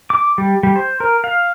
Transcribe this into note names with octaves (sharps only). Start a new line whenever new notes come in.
D6
G3
G3
C5
A#4
F5